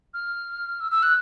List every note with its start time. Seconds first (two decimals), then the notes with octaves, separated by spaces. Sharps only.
0.14 F6
0.80 E6
0.91 E6
1.03 F#6